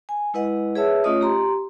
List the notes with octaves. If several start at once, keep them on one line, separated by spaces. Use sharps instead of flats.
G#5
G#3 E4 B4 D#5 F#5
G#4 B4 C#5 E5 A5 E6
A3 C#4 F4 C#5 D#5 D#6
G4 A#5 C6